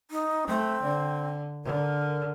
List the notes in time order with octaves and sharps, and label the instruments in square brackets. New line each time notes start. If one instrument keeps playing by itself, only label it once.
[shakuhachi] D#4
[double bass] A3 [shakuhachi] C4
[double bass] D3
[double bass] D3 [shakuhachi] A#4